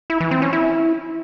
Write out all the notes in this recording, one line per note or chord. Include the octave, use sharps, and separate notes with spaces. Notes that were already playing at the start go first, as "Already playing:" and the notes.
E4
E3
C4
C#4
E4